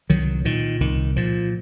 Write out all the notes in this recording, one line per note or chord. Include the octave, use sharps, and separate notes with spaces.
C2 D#3 F#3
A#2 D#3
C2 D#3
A#2 F3